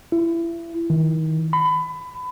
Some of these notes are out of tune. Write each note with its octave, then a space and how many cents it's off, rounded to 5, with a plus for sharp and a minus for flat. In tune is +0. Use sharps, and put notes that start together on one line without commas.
E4 +30
D#3 +30
B5 +25